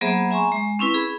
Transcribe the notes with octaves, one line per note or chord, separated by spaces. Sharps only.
F#3 A#3 B3 G#4 C5 E5
E5 G#5 A#5 C6 C#6
G#3
C4 C#4 E4 B4
G#4 B5